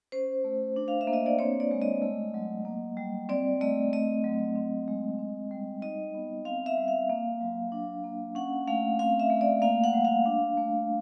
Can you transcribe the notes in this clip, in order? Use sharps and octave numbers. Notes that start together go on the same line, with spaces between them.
C#4 C5
A3
D4
F5
E5
A#3
D#5
D5
C4 C#5
D5
G#3
D#5
A3
F#3
A#3
G3
C4 D5
A3 D#5
A3 D#5
F#3
C4
G#3
C4
G3
D#4 D#5
B3
C4 F5
E5
G3
F5
A#3
F#3
D4
A#3
C#4 F#5
A3 F5
C4 F5
E5
A3
D5
A#3 F5
F#5
G3
F5
D4
A3